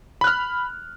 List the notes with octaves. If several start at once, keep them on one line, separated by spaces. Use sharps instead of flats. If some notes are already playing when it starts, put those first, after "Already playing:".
B5 F6 F#6